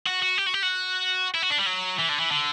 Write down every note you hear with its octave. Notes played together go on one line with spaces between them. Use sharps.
F#4
F#4
G4
F#4
G4
F#4
E4
F#4
D4
G3
F#3
E3
D3
E3
D3